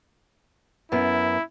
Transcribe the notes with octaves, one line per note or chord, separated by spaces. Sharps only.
F#2 B3 E4